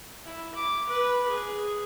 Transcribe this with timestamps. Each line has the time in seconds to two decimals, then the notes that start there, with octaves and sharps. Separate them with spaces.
0.25 E4
0.55 D6
0.89 B4
1.28 G#4